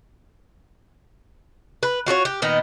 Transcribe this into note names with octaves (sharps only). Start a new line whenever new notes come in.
B4
F4 F#4 G#4 C#5
G4
A#2 D#3 B3 D#4